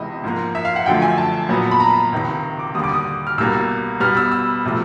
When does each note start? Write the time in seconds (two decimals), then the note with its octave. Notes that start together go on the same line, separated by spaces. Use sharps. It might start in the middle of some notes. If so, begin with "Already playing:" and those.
Already playing: C#2 C3 E3 G#3 B3 D#5 E5
0.24 G#2 F3 A#3
0.55 E5
0.65 F5
0.76 F#5
0.86 F#2 D3 F3 A3 G5
1.02 G#5
1.18 A5
1.49 A#2 F#3 B3
1.71 B5
1.80 A#5
2.12 C#2 C3 D#3
2.59 D6
2.75 D#2 D3 G3 D#6
2.84 D6
2.94 D#6
3.27 F6
3.38 C2 B2 G3 A#3 E6
4.00 B2 G3 B3 F6
4.17 E6
4.32 E6
4.66 C3 F3 A3